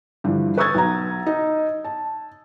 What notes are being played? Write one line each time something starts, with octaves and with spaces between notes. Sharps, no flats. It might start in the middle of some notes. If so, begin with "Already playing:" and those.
G2 D3 E3 F3
B4 C#6 D#6 E6 G#6 A6
B1 A#5
D#4
A5